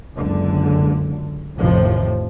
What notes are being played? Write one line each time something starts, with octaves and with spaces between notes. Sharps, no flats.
F#1 C#2 F#2 D3
A1 F2 A2 C3 D#3 F3